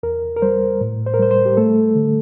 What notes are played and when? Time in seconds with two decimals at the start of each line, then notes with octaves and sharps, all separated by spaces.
0.03 E2 A#4
0.36 A#4
0.42 G3 C5
0.81 A2
1.06 C5
1.14 A#4
1.19 G3 C5
1.31 C5
1.46 G4
1.57 A3 A4
1.95 D3